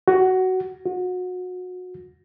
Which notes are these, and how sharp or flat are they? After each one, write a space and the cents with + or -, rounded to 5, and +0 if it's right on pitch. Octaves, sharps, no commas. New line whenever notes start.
F#4 +15
F#4 -25